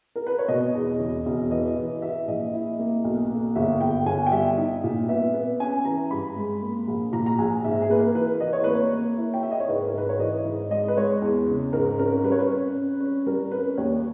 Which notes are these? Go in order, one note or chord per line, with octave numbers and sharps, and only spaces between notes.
A#4
B4
C#5
B2 D#5
E2
E1
E1
E3 D#5
E3
E3 E5
A#1 D#5
E4
A#3
B1
A#3
G1 E5
G1 G5
G1 G#5
G5
G3 E5
D#4
A#2
B3 E5
B3
C#4 G#5
E3 A#5
G2 B5
G#3
A#3
A#1
A#2 A#5
A#5
A#1 G#5
G#2 E5
G#4
A#3 B4
A#4
E3 B4
E3 D#5
C#5
A#3 B4
C#5
A#3
E4
G5
E4 E5
D#5
C#5
G#2 B4
A#4
G#2 B4
C#5
E3 D#5
G#2
G#3 D#5
B4
G#3 C#5
E2
C#3
G#2 A#4
C#4 A#4
G3 B4
C#5
B4
C#4
C#4
C#4
G3 A#4
C#4 B4
D#2 C#5